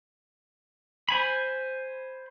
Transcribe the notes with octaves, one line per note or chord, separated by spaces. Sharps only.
C5 G#5 B5